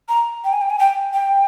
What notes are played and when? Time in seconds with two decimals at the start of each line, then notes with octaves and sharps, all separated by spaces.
0.09 A#5
0.44 G5
0.53 G#5
0.62 G5
0.70 G#5
0.79 G5
1.13 G5